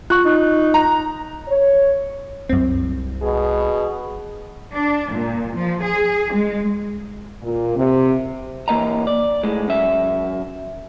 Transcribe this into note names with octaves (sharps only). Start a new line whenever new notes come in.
F4 C#6 F#6
D#4
A#5
C#5
C2 F#2 C4
B2 G#4
D4
A#2
F3
G#4
G#3
A#2
C3
E3 A#3 D#5 A#5
D5
A2 G#3
F#2 E5